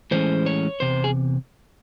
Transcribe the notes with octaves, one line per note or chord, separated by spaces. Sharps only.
A2 E3 G#3 C#4 C5
C#5
E2 C3 C5
G#4